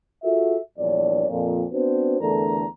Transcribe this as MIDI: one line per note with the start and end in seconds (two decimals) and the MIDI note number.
0.24 0.57 65
0.24 0.57 66
0.24 0.57 68
0.24 0.57 69
0.24 0.57 76
0.78 1.25 34
0.78 1.25 40
0.78 1.25 43
0.78 1.25 73
0.78 1.25 74
1.29 1.63 41
1.29 1.63 46
1.72 2.19 59
1.72 2.19 60
1.72 2.19 62
1.72 2.19 66
1.72 2.19 71
1.72 2.19 72
2.20 2.64 40
2.20 2.64 50
2.20 2.64 57
2.20 2.64 62
2.20 2.64 70
2.20 2.64 82